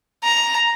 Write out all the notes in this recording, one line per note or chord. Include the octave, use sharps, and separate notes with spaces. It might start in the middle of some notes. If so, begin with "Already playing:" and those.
A#5